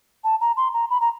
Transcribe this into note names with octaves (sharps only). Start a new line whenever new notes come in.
A5
A#5
C6
A#5
B5
A#5